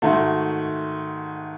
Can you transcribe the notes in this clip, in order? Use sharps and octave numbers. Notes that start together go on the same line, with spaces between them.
G#2 D#3 A3 F#4